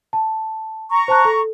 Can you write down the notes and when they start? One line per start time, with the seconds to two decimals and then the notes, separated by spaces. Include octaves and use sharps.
0.13 A5
0.90 A#5 C#6
1.08 C5 A5 F#6
1.25 A4